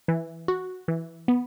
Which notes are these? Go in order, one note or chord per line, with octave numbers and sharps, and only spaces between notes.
E3
F#4
E3
B3